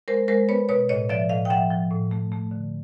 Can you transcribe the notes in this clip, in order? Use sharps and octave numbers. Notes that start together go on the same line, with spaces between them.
G#3 A#4 C5
G#3 A#4 C5
B3 B4 C#5
B2 B4 C#5
A2 C#5 D#5
F3 D5 E5
A2 D#5 F5
G5
F3 E5 F#5
F3
A2
A3
A3
D3